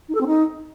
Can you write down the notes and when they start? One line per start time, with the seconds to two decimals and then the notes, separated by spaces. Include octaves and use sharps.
0.09 D#4
0.15 A4
0.21 C4
0.27 D#4